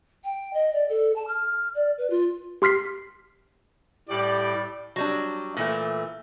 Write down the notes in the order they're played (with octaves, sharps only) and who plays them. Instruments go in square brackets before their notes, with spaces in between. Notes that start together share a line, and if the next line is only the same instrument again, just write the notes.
[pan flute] G5
D#5
D5
A4
A5
F6
D5
B4
F4
[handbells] G4 C6 F6 B6 C7
[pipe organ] A2 [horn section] G3 D5 [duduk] G4
[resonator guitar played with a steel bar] F#3 G3 D4
A#2 E3 A3